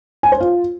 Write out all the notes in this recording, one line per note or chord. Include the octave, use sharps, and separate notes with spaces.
G#5
C5
F4